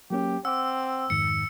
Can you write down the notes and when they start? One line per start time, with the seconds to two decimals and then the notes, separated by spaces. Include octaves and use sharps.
0.10 F#3 A#3 C#4 G4
0.45 C4 F#5 D6 E6
1.10 F2 G#2 D#3 C#7